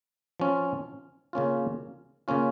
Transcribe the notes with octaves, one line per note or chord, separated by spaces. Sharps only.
F3 C#4 F4
C#3 A#3 C#4 F4
C#3 A#3 C#4 F4